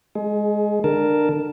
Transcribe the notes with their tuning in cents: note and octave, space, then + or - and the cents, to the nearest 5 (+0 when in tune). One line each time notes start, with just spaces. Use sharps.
G#3 +0 G#4 +30
D3 +25 A#4 +0 A5 +0